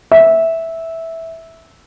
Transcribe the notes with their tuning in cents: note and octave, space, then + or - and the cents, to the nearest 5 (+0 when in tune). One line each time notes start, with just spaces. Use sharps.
E5 -10